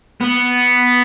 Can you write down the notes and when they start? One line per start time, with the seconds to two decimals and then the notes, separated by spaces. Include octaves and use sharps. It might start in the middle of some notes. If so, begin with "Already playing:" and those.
0.21 B3